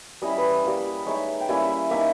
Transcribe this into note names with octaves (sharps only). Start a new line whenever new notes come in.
G3 C#4 E4 D#5
E5
B4 D#5
G3 A#3 E4
G#3 D#4 C#5 E5
G5
G3 A#3 C#4 E4 E5 G#5
A#3 D#4 E5 G#5